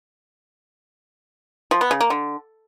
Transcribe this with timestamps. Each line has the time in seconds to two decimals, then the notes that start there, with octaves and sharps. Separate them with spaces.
1.71 F3
1.81 B3
1.91 C#3
2.01 A#3
2.10 D3